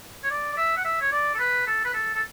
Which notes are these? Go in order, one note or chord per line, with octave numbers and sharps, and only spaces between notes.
C#5
D5
D5
E5
F#5
E5
C#5
D5
A4
B4
A4
B4
A4
A4